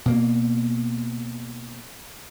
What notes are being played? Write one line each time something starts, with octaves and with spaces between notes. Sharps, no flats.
B2 A#3